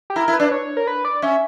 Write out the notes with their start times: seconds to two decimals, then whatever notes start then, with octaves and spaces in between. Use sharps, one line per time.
0.10 G4
0.16 E4 A#4
0.28 E4
0.34 B4
0.40 D4
0.52 C#5
0.77 A#4
0.87 B4
1.05 D5
1.22 C#4 E5